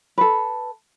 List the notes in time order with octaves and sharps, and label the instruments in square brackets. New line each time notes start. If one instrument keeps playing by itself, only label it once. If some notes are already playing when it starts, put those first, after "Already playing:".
[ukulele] A4 B4